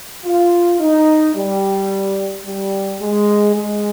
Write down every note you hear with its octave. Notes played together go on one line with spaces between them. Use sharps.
F4
D#4
G3
G3
G#3
G#3